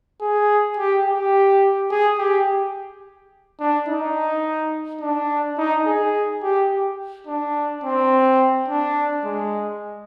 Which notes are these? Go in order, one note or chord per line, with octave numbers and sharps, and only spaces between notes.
G#4
G4
G4
G#4
G4
D4
D#4
D4
D#4
G#4
G4
D4
C4
D4
G#3